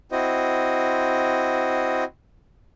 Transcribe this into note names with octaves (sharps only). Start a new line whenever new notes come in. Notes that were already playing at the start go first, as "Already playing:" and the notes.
C4 E4 F#4 C5 D#5